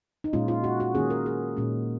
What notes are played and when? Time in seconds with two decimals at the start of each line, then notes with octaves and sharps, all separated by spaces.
0.24 D#4
0.33 A#2 G#3 C#4 F4
0.48 F4
0.64 F#4
0.80 F#4
0.95 D#3 A#3 C#4 G#4
1.10 A#4
1.26 G#4
1.57 A#2 G#3 C#4